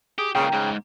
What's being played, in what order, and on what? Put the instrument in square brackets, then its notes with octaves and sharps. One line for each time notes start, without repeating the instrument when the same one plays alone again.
[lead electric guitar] G4 [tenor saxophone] G#4
[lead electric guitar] C#2 A#2 [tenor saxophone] C#3 [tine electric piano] G5 A#5
[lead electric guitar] G#2 [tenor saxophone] C#3